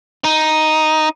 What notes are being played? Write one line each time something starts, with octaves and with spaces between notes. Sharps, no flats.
D#4